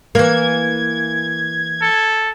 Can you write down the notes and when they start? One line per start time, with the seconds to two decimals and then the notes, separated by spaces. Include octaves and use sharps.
0.15 E3 A#3 G#6
1.82 A4